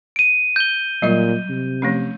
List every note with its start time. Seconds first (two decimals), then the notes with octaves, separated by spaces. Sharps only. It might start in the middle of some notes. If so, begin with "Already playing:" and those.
0.16 D7 D#7
0.56 G6 G7
1.02 A#2 F#3 G3 D#5
1.49 C3
1.82 F3 A3 C#4